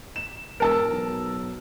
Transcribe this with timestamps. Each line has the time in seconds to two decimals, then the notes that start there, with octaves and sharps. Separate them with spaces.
0.16 E7
0.60 E1 A#4 A5 E6
0.91 B1